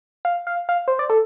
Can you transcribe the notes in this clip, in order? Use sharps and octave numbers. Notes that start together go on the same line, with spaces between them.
F5
F5
F5
C5
D5
A4